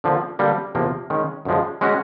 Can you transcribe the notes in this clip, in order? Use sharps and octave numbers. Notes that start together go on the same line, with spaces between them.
D3 F3 A#3
D3 G3 A#3
E2 C3 F3 A#3
D#3 G#3 C#4
F#2 D3 F3 G#3
G#3 C#4 F#4